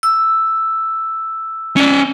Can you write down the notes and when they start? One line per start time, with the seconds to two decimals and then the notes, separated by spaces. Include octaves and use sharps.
0.03 E6
1.76 C#4 D5